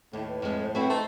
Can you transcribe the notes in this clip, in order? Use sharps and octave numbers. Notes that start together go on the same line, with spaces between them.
D#2 A2
B4
F2 G#3
C5
C4 E4 F#4 B4
A3 D#4 C5